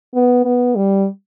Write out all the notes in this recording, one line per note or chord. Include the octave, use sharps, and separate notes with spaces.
B3
B3
G3